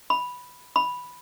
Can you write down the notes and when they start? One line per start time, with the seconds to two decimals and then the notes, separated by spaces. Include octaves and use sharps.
0.10 B5
0.76 B5